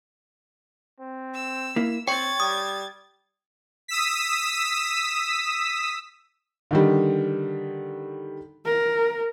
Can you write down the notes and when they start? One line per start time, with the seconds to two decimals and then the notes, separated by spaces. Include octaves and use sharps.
1.00 C4
1.35 E6
1.76 A#3 E4
2.08 C4 C#5 G5 C#6 G#6 A6
2.40 G3 D#6
3.88 D#6 E6 B6
6.71 D3 D#3 G3
8.65 A#4